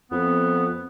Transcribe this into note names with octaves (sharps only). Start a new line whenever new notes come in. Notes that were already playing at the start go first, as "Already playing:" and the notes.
F2 B3